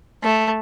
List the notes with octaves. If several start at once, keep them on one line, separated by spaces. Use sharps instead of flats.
A3